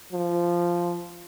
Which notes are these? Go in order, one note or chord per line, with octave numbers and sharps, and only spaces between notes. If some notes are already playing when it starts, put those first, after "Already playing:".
F3